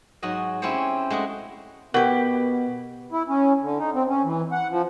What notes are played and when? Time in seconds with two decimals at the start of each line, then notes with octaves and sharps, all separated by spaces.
0.22 G#2 F#3 F#4 D#5
0.62 C4 C#4 E4 G4 C5 C#5
1.10 G#3 A3 F#4 G#4
1.94 B2 B3 G4 A#4 F#5
3.12 E4
3.29 C#4
3.61 D3
3.79 D#4
3.94 C4
4.09 C#4
4.24 E3
4.52 F#5
4.70 F3